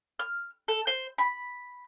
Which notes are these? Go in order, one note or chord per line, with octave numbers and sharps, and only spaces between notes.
F6
A4
C5
B5